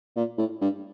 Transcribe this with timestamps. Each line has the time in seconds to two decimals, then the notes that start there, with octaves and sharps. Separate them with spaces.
0.16 A#2
0.38 A2
0.61 G2